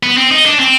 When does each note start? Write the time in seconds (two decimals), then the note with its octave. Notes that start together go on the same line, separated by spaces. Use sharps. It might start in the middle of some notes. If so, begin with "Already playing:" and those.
0.03 B3
0.17 C4
0.32 D#4
0.46 D4
0.59 C4